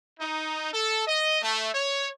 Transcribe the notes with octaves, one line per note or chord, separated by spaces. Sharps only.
D#4
A4
D#5
A3
C#5